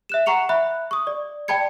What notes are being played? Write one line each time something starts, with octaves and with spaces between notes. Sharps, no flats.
E5 F#6 E7
F#5 A#5 C#6 C#7 F7
E5 B5 F#6
C#6 D#6
D5
D5 G5 A5 B5 G#6 C#7